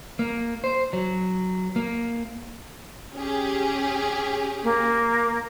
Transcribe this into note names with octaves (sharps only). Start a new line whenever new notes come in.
A#3
C5
F#3
A#3
C#4 G4 G#4
A#3